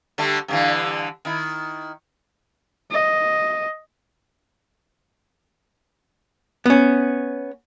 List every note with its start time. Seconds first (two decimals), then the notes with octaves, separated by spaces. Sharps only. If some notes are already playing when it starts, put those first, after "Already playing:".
0.18 D3 G3 A3
0.48 G2 D3 E3
1.25 D#3 E4
2.91 D#5
6.66 B3 C#4